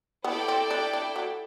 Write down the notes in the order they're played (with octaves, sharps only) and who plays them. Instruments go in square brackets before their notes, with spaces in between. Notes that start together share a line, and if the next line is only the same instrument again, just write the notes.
[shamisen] B3 [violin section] E4 A4 D5 G5
[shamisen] C4
D4
D4
F#3